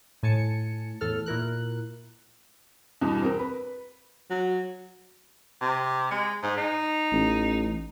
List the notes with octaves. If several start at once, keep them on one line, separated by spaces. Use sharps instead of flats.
A2 G#5 A5 C#7
E2 A2 A4 F6
A#2 E4 A#4 F#6
E2 G2 B2
C4 A#4
B4
F#3
C3
G#3
G#2
D#4
A1